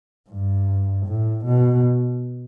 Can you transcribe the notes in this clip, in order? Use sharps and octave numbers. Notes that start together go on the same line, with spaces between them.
G2
A2
B2